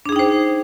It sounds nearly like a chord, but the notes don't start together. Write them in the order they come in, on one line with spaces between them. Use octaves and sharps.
D4 G#4 D#4 G5 C5